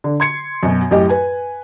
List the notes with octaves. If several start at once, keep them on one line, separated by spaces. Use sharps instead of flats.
D3
C6 G#6 C#7
F#2 B2
F#2 A2 G4 D#5
B4 G#5